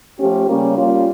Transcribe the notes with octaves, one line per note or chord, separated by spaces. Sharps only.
F3 A3 C#4 G4
C#3 G3 A#3 C#4
G3 A#3 C#4 F4